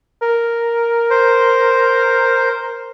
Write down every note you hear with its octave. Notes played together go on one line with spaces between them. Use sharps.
A#4
C5